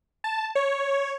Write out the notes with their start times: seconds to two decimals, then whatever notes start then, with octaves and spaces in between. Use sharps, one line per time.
0.24 A5
0.55 C#5